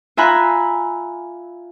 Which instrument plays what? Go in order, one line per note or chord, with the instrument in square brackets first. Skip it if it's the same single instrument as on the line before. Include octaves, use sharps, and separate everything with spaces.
[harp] F4 E5 G#5 A#5 B5 F#6